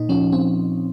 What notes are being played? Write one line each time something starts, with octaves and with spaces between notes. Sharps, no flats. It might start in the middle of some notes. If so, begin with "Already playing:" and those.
Already playing: A#2 D#4
F3 C#4
C4